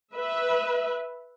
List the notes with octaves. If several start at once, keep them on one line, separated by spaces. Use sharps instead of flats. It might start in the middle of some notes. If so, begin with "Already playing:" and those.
B4 E5